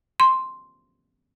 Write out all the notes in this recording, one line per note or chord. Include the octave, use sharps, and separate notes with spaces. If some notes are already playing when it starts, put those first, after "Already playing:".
C6